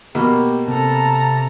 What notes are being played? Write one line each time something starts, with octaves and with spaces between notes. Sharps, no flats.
B2 A#3 G4
C3 A4 A5 A#5